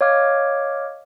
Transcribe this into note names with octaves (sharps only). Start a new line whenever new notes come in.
C#5 D#5 F5 D6 F6 G#6